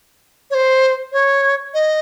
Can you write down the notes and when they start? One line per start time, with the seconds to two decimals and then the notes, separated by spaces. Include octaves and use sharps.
0.50 C#5
0.54 C5
1.12 C#5
1.74 D#5